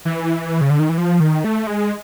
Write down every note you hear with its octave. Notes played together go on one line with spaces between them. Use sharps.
E3
C#3
D3
D#3
E3
F3
D#3
A3
G#3